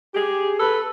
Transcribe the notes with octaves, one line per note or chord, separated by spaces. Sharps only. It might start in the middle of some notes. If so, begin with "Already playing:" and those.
G4 G#4
A4 B4